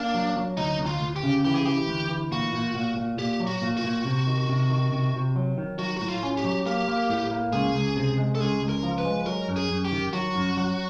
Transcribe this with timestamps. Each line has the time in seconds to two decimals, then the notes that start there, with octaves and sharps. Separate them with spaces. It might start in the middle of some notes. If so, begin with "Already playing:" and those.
Already playing: A#3 D4
0.14 F#3
0.36 F#3
0.57 D2 D#4
0.80 D2
0.86 F4
1.01 D2
1.16 G4
1.23 C#3
1.45 E3 G4
1.55 G#4
1.65 E3 G4
1.88 D2
2.09 E3
2.31 A#2 F#4
2.53 A#2
2.75 A#2
2.96 A#2
3.18 A#2 G4
3.40 F#3
3.47 F#4
3.62 A#2
3.77 F#4
3.83 A#2
4.05 C3
4.27 D#3
4.49 C3
4.70 D#3
4.92 C3
5.13 C3
5.36 F#3
5.57 D#3
5.79 F#3 F#4
5.97 A2 F#4
6.08 F4
6.23 C#4
6.37 G4
6.45 F#3
6.66 A#3 G4
6.88 A#3
7.10 A2
7.31 A#3
7.53 C#2 G#4
7.74 C#2
7.96 C3
8.18 G#3
8.35 A4
8.39 C#2 G#4
8.61 C#2
8.69 A#4
8.83 F3
8.98 B4
9.05 G#3
9.26 F#3 A#4
9.48 F#2
9.56 G#4
9.70 F#2
9.85 G4
9.92 D#3
10.13 F#3 F#4
10.35 F#2
10.57 F#3